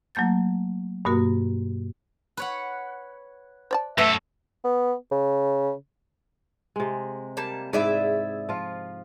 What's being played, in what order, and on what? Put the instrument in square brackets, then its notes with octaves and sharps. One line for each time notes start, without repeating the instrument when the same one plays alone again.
[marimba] F#3 A3 A#3 G6 A6
G2 B2 A#3 F#4 A#4
[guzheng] B4 C#5 F#5
[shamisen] C5 D5 A5
[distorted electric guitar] F#2 A4 [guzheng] A3 [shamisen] B4 [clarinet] E5
[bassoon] B3
C#3
[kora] C3 G#3
[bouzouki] G3 A#3 A5
[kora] G#2 E4 [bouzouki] G#4 D5 E5
[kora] F3 F4